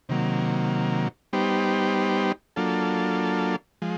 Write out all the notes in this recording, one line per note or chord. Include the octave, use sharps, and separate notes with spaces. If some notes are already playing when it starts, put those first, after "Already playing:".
C3 D#3 F#3 A#3
G3 B3 D#4 G4 C5
F#3 A#3 D4 F4 A4
F3 G#3